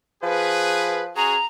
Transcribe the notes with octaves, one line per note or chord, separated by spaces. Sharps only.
F3 G#4 B4
C#4 F#4 G#4 A#5